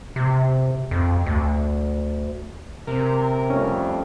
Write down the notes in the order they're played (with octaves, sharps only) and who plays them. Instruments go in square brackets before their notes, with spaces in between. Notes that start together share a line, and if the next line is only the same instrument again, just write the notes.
[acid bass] C3
F2
D2
[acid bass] C3 [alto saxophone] A#4
[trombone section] F2 G3 A3 [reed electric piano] C#4